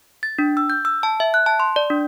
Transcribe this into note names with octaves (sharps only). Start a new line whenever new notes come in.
A6
D4
E6
G6
E6
A5
E5
F#6
A5
C6
D5
D4